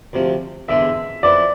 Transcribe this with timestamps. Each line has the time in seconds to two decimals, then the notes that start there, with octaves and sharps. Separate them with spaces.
0.13 D2 C3 F3
0.68 E2 D3 G#3 D4 E5
1.23 F2 E3 B3 E4 D5